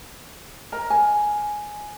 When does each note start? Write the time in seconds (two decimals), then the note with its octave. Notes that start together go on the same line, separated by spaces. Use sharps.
0.72 A#4 D#5 A#5
0.90 G#5